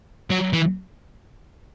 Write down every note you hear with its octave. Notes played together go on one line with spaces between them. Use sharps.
F#3
E3